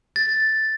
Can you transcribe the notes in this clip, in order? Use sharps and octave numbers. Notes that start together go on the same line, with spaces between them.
A6